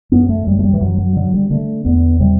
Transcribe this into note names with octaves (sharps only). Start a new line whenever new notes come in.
F#2 B3
A3
F#2 G3
A3
G3
E3
F#2 F#3
F#3
D3 F#3
G3
D3 A3
E2 B3
C3 G3